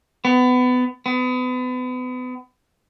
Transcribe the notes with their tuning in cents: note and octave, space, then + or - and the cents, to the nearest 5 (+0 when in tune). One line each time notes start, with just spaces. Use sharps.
B3 +25
B3 +35